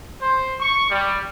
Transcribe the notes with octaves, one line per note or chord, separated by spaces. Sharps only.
C5
C#6
G3